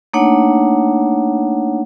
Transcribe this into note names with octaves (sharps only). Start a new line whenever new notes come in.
A3 A#3 D4 D#4 C#5 F#5